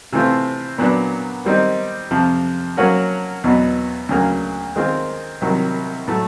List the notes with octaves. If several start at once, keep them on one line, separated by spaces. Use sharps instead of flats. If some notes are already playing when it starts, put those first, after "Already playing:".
C3 E3 A3 C4 F4
A#2 F#3 B3 D4
D#3 G3 C4 D#4
F2 C3 F3
F#3 A#3 C#4 F#4 A#4
E2 B2 F#3 B3
D2 C#3 F#3 A#3
D#3 G#3 C4 F4 A#4
C2 C3 D#3 F#3
A2 F#3 A3